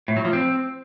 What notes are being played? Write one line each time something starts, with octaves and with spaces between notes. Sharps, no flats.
A2
F#3
F3
C4